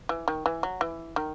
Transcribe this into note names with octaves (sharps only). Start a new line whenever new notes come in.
E3
D#3
E3
F#3
E3
D#3